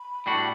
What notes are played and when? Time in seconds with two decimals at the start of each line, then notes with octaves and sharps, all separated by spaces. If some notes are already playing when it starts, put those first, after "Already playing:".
Already playing: B5
0.26 A2 G3 D4 F#4